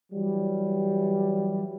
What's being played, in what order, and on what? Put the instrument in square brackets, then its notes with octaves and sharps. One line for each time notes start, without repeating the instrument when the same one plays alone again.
[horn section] E3 F#3 G3